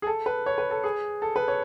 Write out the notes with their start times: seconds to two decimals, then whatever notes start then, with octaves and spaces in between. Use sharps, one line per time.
0.02 G#4
0.07 A4
0.26 B4
0.46 C#5
0.58 B4
0.71 A4
0.84 G#4
1.22 A4
1.36 B4
1.48 C#5